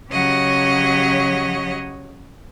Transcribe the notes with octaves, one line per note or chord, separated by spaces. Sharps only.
C#3 F#3 G4 C#5 D#5 F#5